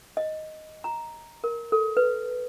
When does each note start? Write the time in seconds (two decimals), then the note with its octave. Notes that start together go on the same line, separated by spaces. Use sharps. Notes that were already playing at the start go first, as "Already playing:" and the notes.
0.17 D#5
0.84 A#5
1.44 A#4
1.72 A4
1.97 B4